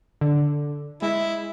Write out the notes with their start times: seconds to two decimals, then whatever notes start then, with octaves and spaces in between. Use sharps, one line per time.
0.21 D3
1.02 G#3 E4